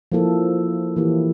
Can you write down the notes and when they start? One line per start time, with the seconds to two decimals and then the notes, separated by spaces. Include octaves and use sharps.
0.12 F3 A#3 E4 A4
0.96 E3 A#3 E4 G4